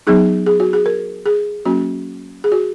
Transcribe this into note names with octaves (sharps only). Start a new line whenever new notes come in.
F#3 B3 D#4 G#4
G#4
F#4
G#4
A#4
G#4
F#3 A#3 C#4 F#4
G#4
F#4